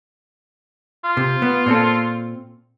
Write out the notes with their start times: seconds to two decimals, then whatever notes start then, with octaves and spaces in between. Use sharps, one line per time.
1.04 F4
1.17 C3
1.42 B3
1.66 A#2 C4 A4